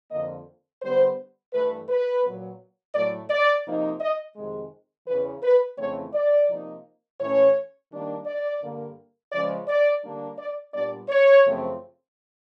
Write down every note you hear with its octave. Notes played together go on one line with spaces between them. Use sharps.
F2 D3 F3 A#3 D#5
D3 G3 B3 C5
G2 E3 A3 B4
B4
A#2 F#3 B3
A2 F#3 A3 D5
D5
C3 F3 A#3 D#4
D#5
F2 C3 D#3 G#3
E2 C#3 E3 B4
B4
F2 C#3 E3 A3 C4 C#5
D5
C3 F3 A#3 D#4
A2 E3 A3 C#4 C#5
D#3 G3 A#3 D4
D5
G2 D3 G3 A#3
C#3 F3 G#3 C#4 D5
D5
D3 G3 A#3 D4
D5
A#2 G3 B3 D4 D5
C#5
F#2 C#3 F3 A3 C4